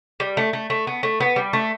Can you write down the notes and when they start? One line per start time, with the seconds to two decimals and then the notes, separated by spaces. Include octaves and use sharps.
0.20 G3
0.37 A3
0.53 A3
0.70 A3
0.87 B3
1.03 A3
1.20 B3
1.36 G3
1.53 A3